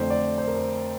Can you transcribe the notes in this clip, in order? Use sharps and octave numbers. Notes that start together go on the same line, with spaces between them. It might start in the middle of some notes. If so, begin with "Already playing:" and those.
Already playing: F2 D3 A3 C5
D5
C5
A#4
C5